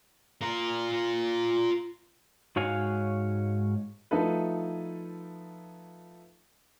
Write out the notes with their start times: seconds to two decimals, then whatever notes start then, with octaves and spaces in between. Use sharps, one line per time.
0.41 F4 A#4
2.56 G#2 F#4 C#5 F5 G#5
4.11 F3 A3 D#4 E4 A4 B4